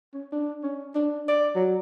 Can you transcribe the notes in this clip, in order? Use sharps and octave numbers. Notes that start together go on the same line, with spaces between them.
C#4
D4
C#4
D4
D5
F#3